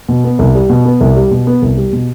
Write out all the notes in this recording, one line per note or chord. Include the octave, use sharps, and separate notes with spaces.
B2
B3
C2
G3
B2
B3
C2
G3
B2
B3
C2
G3
B2